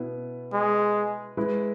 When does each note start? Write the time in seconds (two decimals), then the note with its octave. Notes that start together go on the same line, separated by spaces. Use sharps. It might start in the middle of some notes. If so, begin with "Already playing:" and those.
Already playing: B2 B3 E4 B4
0.53 G#3
1.37 G#3 E4 B4